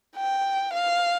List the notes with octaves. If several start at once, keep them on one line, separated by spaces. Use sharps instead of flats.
G5
F5